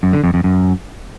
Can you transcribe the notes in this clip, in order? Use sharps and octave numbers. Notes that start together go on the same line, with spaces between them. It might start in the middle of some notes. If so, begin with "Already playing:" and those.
F#2
D3
F2
F2
F#2